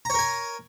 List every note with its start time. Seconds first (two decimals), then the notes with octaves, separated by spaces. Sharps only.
0.05 A#5
0.10 C#5
0.14 A#4
0.19 G#5